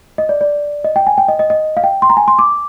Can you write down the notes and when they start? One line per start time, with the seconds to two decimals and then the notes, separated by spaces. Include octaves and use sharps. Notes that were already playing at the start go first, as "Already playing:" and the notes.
0.18 D#5
0.29 D5
0.41 D5
0.84 D#5
0.96 G5
1.07 G#5
1.18 G5
1.28 D#5
1.39 D#5
1.50 D#5
1.77 F5
1.84 G5
2.02 C6
2.10 A#5
2.17 G#5
2.28 C6
2.39 D6